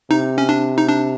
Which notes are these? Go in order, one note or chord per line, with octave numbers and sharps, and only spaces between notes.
C3 D#4
C#4
D4
D#4
D4